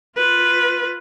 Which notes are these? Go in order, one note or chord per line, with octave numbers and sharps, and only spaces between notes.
F4 B4